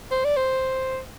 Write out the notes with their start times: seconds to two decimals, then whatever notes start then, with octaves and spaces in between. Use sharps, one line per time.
0.11 C5
0.24 D5
0.37 C5